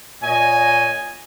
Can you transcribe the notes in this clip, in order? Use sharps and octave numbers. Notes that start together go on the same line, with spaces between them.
A#2 C#5 D#5 G#5